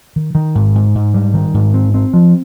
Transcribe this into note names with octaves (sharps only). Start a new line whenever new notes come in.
D#3
D#3
G#2
G#2
G#2
G3
D#3
G#2
C4
C4
F3